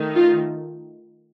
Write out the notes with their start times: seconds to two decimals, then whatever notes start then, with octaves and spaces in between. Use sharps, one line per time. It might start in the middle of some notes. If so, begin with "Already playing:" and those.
Already playing: D#3 A3 D#4
0.16 F4